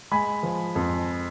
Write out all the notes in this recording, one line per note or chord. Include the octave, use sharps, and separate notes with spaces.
G#3 G#5 B5
F3
F2